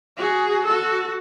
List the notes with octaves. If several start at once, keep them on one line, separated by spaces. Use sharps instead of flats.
F#4 G#4
F#4 A4